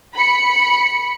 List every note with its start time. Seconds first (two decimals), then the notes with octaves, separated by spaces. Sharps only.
0.15 B5 C#7